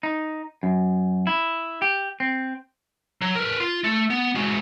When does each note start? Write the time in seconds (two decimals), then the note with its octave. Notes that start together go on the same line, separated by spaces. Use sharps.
0.03 D#4
0.63 F#2
1.27 E4
1.82 G4
2.20 C4
3.21 F#3
3.35 A#4 B4
3.60 F4
3.84 A3
4.10 B3
4.35 G#3 F#4